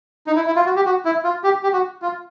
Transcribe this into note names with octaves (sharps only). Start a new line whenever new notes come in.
D#4
E4
E4
F4
F#4
G4
F#4
E4
F4
G4
G4
F#4
F4